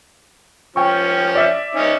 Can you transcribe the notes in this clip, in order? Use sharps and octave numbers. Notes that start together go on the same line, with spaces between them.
F3 C#4 G5 C#6
D5 E5
C#4 D#4